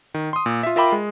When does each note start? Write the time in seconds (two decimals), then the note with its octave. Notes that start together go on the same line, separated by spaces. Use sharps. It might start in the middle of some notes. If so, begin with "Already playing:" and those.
0.14 D#3
0.33 C6 D#6
0.46 A#2
0.63 F4 E5
0.76 F4 A#4 E5 G5 B5 D6
0.92 G#3